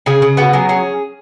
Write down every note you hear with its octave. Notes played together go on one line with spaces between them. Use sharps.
C#3 G#4
C#3
B3 F#4
F#3 G#4
C#4 G#4